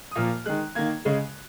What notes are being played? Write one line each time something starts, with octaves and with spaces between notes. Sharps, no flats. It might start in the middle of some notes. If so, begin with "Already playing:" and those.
D#6
A#2 F3 A#3 F6
D#3 G#3 F#6
D#3 A#3 G#6
C#3 G#3